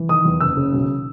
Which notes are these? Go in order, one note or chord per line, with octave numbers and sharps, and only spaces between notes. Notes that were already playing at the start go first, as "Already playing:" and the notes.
Already playing: E3
D#3 D#6
E2
F#1 E6
C#3
B1